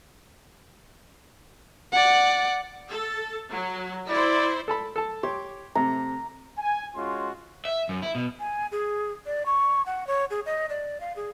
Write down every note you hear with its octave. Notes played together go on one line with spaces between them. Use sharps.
D5 F#5
A4
F#3
E4 C5 D5
A4 A5 B5
A4 A5
G4 C#5 C6 D6
C3 A3 A#5
G#5
G#3 C#4 F4 F#4 C6
E5
F#2
E4
B2
G#5
G#4
D5
C#6
F#5
C#5
G#4
D#5
D5
F5
G#4